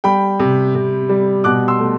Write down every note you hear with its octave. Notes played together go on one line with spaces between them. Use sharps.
G3 G5 B5
C3
C3
G3
B2 D6 F#6
C6 E6
A3